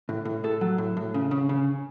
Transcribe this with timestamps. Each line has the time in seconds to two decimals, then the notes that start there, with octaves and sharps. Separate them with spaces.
0.09 A2
0.25 A2
0.44 A2 A4
0.61 F#3
0.78 A2
0.97 A2
1.14 C#3
1.31 C#3
1.49 C#3